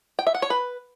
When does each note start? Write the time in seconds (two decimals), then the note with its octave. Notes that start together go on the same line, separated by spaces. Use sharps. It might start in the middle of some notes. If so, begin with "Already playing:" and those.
0.19 G5
0.27 E5
0.34 F#5
0.42 C#5
0.50 B4